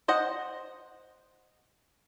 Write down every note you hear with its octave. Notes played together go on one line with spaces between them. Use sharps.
C5 D#5 F#5